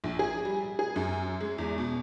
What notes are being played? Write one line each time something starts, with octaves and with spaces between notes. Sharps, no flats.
A#1
G#4
G3
G#4
F#2
G#3
E2
B2